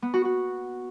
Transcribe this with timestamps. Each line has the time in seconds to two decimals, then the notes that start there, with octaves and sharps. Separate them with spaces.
0.02 B3
0.14 F#4
0.25 F#4